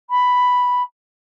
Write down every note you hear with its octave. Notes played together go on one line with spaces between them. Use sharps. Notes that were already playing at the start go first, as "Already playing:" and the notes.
B5